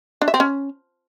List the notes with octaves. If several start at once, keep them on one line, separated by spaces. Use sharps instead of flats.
D4
E5
C4
C#4